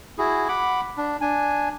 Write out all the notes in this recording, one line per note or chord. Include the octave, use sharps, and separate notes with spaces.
E4 F#4 G#4
F#5 B5 D6
D4
D4 G#5